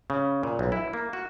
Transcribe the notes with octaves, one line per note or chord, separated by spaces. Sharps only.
C#3
A#2
B1
E4
A#3
F#4